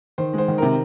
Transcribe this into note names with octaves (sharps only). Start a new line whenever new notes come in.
D#3 C5
G#3 C5
D#3
C3 A#4